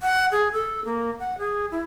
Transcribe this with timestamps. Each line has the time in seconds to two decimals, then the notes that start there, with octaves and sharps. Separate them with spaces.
0.01 F#5
0.32 G#4
0.52 A4
0.85 A#3
1.19 F#5
1.39 G#4
1.71 E4